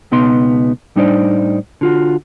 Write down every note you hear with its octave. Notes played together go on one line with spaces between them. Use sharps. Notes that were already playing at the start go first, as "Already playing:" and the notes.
C#2 B2 B3 D#4 C6
A2 G3 D4 D#4 C5 D5
D3 F4 F#4